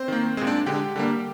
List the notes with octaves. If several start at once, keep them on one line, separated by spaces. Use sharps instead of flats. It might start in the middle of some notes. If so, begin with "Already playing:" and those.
Already playing: C4 C5
D#3 A#3
A#2 G#3 C4 C5
D4 D5
D3 G#3 G4 G5
D3 G3 A#3